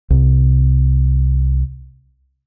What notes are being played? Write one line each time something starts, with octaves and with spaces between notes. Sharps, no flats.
C2 C3